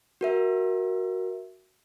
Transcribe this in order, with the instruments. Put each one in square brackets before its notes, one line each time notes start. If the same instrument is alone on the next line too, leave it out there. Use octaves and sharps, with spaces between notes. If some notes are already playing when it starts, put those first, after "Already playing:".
[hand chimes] F#4 A#4 E5